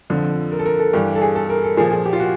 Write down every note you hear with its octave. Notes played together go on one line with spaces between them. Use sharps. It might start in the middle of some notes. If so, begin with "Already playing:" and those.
F2 D3 F3
A#4
A4
A#4
A4
G2 E3 G4
A4
G#4
A4
A#4
A4
A#2 F3 G#4
G#4
G4
F4
F#4